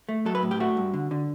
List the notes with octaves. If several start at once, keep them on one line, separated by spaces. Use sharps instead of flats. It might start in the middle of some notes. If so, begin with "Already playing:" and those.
A3
F#3 A4
B4
A2
G4
A3 F#4
G2
D3
D3